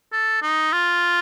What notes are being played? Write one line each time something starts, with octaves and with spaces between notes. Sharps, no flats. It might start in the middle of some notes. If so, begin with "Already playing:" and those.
A4
D#4
F4